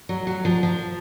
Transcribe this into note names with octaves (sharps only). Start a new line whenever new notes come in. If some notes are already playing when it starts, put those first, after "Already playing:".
F#3
F#3
F3
F3